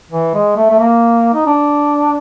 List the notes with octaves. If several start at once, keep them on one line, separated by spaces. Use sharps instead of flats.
E3
G#3
A3
A3
A#3
D#4
D4